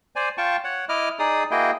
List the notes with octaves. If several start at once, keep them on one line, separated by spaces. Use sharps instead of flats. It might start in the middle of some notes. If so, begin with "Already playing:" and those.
C5 D5 G#5
F4 G5 A5 C#6
C#5 F#5
E4 D#5 D6 F6
D#4 G#4 D5 D#6
A#3 E4 F#4 G#4 D#5 G5